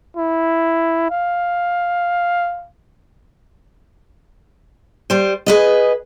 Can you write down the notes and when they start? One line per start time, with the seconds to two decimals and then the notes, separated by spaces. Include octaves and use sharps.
0.17 E4
1.10 F5
5.10 G3 C5
5.46 G#4 B4 D#5